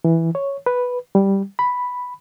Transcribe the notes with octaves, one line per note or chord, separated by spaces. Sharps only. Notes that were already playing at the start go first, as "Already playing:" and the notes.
E3
C#5
B4
G3
B5